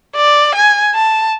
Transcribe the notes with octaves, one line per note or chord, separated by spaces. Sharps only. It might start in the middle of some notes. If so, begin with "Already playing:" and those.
D5
G#5
A5